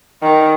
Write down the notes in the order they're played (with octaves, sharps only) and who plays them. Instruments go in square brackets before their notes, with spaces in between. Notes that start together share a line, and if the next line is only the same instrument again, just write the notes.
[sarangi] D#3